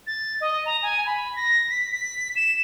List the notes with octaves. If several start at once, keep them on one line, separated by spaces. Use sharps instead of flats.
A6
D#5
A#5
G#5
B5
A#6
B6
B6
E7